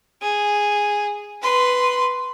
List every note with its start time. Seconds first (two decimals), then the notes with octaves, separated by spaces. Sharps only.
0.22 G#4
1.42 B4 C6